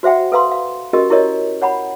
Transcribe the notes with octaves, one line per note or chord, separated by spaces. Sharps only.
F#4 C5 E5 F#5 G5
A4 B4 F5 A#5 C6
F5
C#4 F#4 G4 A#4 D#5
E4 G4 A#4 C#5 D#5
C#5 F#5 A#5 B5